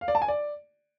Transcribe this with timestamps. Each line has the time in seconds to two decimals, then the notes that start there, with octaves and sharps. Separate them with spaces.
0.01 F5
0.08 D5
0.15 A5
0.22 G#5
0.28 D5